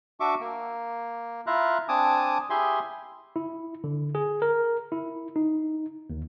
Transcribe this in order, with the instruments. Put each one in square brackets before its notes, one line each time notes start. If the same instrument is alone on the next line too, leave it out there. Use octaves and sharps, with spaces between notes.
[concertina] D4 F#4 E5 C#6 D6
A#3
E4 F4 E5 F5 A#5 F#6
C4 D4 G#5 A5 D6 D#6
E4 G4 G#4 E5 G#5 C6
[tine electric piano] E4
D3
G#4
A#4
E4
D#4
D#2